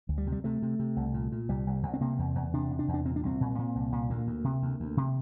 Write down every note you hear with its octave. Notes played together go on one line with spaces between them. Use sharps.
D2
G3
C3
G3
C3 A3
C3
C3
C2
A#2
A#2
C2 G3
C2
C2
C4
C3 A#3
E2
E2
C3 D4
C3
D4
E2
D4
A#2 C4
D4
C2 C4
A#2
A#2
C2
A#2
D2 A#3
D2
C3
D2
D2
C3